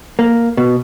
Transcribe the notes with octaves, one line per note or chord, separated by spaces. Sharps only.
A#3
B2